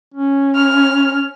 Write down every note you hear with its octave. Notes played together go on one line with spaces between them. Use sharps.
C#4
F6